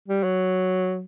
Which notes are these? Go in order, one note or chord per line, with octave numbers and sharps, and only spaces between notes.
G3
F#3